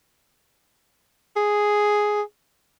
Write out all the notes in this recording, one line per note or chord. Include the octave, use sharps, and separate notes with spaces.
G#4